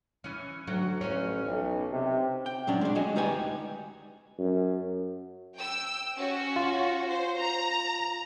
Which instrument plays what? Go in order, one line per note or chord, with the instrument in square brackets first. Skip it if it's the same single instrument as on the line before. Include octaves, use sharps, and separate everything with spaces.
[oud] E3 C#4
[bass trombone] D2 [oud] F#3
[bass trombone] A1 [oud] C#4 C5 C#5
[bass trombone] B1
C3
[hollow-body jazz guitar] G5
A#2 F#3 C#4 D4
G#3 D4
G#3 F#4 G#5
D2 G3 D#4 B4 G5 G#5
[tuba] F#2
[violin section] G5 E6
C#4 F#4
[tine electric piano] F4
[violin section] C5
A#5